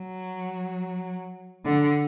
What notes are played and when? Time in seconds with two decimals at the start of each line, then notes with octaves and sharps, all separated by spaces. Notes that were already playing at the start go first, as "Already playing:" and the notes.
Already playing: F#3
1.65 D3